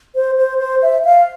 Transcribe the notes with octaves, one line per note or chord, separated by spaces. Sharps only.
C5
C5
C5
E5
F5